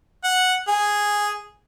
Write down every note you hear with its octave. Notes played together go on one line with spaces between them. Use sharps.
F#5
G#4